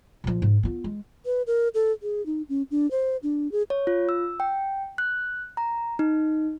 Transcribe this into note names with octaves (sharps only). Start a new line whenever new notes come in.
A#2 F3
G#2
B3 F4
G#3
B4
A#4
A4
G#4
D#4
C#4
D4
C5
D4
G#4
C#5
F4
E6
G5
F#6
A#5
D#4